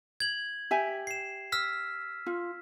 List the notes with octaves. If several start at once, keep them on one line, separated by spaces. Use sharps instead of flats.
G#6 F#7
G4 E5 G#5
C7 E7
E6 F6 B6
F4